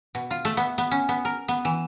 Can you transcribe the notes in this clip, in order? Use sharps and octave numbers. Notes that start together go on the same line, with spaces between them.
B2
F4
A3
B3
B3
C#4
B3
A#4
B3
E3